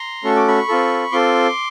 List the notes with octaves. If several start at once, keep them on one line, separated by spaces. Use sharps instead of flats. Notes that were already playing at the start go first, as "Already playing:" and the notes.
Already playing: A#5 C6
A3 C#4 F#4 A4 C#6
D6
B5 C#6
C4 F4 A4
C4 F4 A4 C6 D6